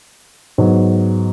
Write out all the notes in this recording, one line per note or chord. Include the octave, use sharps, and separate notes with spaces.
G#2 F#3 B3